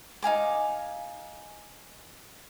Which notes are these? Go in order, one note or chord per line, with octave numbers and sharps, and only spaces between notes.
D#4 F5 G#5 D6